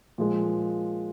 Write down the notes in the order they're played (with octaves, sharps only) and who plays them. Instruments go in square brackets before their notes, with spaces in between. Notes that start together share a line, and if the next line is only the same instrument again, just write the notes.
[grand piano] A#2 F3 G#3